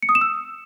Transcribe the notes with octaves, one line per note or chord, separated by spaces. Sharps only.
C#7
D#6
E7
E6